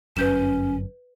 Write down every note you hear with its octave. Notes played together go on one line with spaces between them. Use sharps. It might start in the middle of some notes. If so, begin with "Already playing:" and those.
G1 F#2 C#4 B4 G6 E7